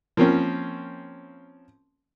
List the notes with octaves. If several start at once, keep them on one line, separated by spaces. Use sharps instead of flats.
F3 A#3 C4 C#4